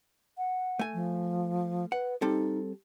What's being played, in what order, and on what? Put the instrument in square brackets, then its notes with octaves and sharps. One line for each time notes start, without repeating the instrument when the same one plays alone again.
[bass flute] F#5
[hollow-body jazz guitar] A3 G#5
[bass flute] F3
[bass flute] B4 [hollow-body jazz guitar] F#5
[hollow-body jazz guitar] G3 C4 A4 [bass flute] D#4